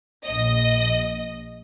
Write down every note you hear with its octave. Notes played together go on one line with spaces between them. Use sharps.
A#1 D#5